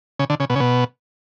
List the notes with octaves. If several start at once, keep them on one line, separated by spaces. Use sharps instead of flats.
C#3
D3
C#3
B2
C#3
B2